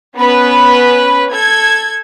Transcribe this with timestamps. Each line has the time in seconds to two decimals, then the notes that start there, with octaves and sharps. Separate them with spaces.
0.17 B3 C#4 B4
1.32 A4 G#6